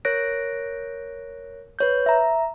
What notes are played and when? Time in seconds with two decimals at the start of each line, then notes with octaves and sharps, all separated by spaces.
0.05 A#4 C#5 F#6 A#6 D7
1.79 B4 C#5 G6
2.06 E5 A#5